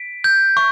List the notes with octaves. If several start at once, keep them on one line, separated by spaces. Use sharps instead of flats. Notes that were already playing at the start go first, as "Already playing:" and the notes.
Already playing: B6 D7
G6
C#6